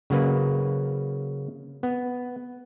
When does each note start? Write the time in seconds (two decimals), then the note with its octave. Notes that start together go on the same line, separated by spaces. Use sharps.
0.10 C#3 F#3 A#3 B4
1.83 B3